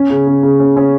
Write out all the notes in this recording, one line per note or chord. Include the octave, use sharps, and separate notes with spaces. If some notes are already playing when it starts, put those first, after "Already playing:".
Already playing: C#4
C#3
C#3
C#3
C#4
C#4